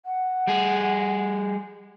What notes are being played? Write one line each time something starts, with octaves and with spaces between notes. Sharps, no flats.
F#5
G3 G#4